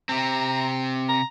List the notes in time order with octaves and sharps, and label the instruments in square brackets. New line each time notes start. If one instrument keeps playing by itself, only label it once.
[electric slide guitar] C3 C4 [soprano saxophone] A#5
[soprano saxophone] A#5